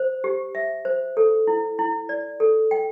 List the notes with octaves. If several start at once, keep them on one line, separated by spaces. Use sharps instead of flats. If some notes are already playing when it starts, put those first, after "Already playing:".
Already playing: C5
G4
E5
C5
A4
E4
E4
D5
A4
G5